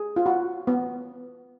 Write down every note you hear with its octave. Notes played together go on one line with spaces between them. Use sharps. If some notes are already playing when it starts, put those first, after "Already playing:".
Already playing: G#4
F4
F#4
B3